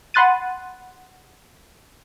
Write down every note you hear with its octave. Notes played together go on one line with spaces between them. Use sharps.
F#5 B5 C6 F#6 A6 D#7